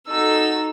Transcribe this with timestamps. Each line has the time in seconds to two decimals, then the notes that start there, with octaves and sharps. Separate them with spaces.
0.09 D#4 F#4 A4 E6